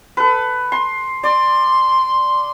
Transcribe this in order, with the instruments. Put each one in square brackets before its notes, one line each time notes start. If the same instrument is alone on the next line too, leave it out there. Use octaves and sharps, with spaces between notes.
[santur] A4 B4
C6
[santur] D5 [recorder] C6